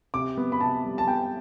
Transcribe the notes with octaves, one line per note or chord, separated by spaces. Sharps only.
C3 D6
B3
B5
C3 A5
G3
A5
B3 G5